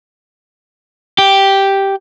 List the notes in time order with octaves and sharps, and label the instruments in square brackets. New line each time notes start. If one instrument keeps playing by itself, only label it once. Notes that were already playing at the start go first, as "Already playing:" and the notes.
[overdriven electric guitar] G4